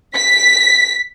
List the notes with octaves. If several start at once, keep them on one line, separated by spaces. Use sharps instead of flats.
B6